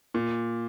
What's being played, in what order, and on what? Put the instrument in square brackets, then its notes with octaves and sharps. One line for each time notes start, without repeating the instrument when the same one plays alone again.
[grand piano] A#2